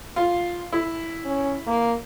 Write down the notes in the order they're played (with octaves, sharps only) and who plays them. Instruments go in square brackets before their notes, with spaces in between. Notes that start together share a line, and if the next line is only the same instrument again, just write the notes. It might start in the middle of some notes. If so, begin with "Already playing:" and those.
[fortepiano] F4
E4
[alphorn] C#4
A#3